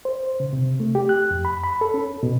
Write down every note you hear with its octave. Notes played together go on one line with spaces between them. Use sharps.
C5
C#3
C3
A3
G4
F#6
F2
B5
B5
A4
C#4
B2